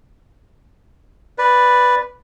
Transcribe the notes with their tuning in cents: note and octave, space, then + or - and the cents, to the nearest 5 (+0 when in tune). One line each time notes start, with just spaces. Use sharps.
B4 +0 D5 +0